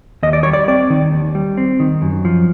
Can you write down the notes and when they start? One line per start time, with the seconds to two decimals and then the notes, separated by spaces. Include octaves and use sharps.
0.23 D#2 D#5
0.33 D5
0.43 G3 C#5
0.53 D5
0.68 C4 D5
0.90 D#3
1.12 D#2
1.35 G3
1.57 C4
1.80 D#3
2.02 F#2
2.25 F3